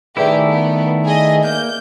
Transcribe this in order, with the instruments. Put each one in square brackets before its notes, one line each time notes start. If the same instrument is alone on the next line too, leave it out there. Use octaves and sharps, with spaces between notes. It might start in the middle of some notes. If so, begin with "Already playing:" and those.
[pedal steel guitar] D#3 A3 E4 [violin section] G4 G#4 [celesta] B4 D5 E5
[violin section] B3
G#4 D#5
[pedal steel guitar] A#3 [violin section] G6